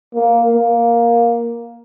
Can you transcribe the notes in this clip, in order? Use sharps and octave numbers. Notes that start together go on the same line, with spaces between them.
A#3
A#3